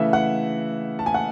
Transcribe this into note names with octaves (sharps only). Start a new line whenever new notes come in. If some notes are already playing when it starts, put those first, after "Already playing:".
Already playing: C#3 E3 A3 E5
F#5
A5
G#5
F#5